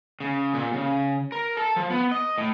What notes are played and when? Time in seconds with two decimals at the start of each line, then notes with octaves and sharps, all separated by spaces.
0.20 C#3
0.54 A#2
0.74 C#3
1.32 A#4
1.57 A4
1.76 F3
1.90 B3
2.11 D#5
2.38 A2